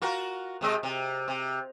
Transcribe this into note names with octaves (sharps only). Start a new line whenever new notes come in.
F4 F#4 A#4
C3 G#3 D#5
C3
C3